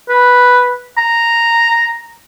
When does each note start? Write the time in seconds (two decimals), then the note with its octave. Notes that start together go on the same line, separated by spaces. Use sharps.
0.09 B4
0.98 A#5